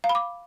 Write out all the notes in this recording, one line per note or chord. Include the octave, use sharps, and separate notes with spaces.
F5
B5
D6